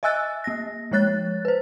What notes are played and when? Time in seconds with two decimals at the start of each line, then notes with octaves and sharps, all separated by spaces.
0.03 D#5 E5 G#5 E6 F#6 A6
0.44 A#3 A#6
0.91 F3 G#3 C#5 F#6 A6
1.45 B4 C5